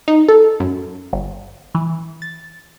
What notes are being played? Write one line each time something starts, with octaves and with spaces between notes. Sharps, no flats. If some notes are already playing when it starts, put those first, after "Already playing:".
D#4
A4
F#2
G1
E3
A6